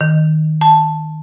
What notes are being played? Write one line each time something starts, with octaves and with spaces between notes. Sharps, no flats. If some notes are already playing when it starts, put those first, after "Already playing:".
D#3
A5